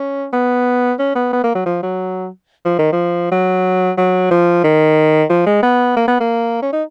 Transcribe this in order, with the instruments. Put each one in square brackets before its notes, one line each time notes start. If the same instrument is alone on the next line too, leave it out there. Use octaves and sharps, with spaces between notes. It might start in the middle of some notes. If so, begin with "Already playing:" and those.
Already playing: [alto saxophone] C#4
B3
C#4
B3
B3
A#3
F#3
F3
F#3
F3
D#3
F3
F#3
F#3
F3
D#3
F3
G#3
B3
A#3
B3
A#3
C#4
D#4